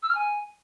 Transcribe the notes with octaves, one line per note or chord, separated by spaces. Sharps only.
E6
F6
G#5